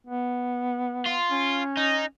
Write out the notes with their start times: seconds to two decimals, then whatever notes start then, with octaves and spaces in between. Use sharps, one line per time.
0.06 B3
1.06 F4
1.31 C#4
1.77 D#4